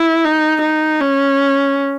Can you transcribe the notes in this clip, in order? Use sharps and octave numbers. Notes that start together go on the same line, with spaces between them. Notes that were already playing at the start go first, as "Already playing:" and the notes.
Already playing: E4
D#4
D#4
C#4